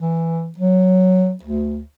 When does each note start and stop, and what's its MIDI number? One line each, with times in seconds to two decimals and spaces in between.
0.01 0.51 52
0.58 1.33 54
1.43 1.82 38